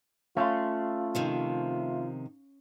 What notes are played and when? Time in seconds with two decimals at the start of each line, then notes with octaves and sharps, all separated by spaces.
0.37 A3 C#4 F4 F5 C6
1.15 C3 D#3 F3